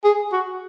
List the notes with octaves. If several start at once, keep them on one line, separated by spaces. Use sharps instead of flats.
G#4
F#4